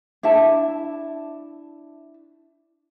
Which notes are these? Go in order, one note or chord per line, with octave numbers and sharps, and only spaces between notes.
D4 E4 E5 A5